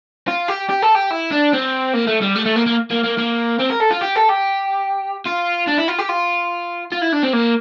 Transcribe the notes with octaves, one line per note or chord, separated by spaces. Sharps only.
F4
G4
G4
A4
G4
E4
D4
C4
A#3
A3
G3
A3
A3
A#3
A#3
A#3
A#3
A#3
C4
A#4
A4
F4
G4
A4
G4
F4
D4
E4
F4
G4
F4
F4
E4
D4
C4
A#3